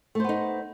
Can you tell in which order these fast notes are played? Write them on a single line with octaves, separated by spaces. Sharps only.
A3 C5 B3 D#4